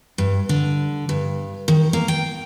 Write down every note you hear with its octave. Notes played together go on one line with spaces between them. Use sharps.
G2
D3
G2
D#3
A#3
G5